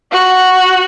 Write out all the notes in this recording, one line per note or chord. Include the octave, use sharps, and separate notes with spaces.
F#4